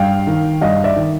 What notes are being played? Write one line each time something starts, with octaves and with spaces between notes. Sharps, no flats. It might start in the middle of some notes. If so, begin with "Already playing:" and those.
Already playing: G2 F5 G5
D#3
G2 D#5 F5
D5 E5
D#3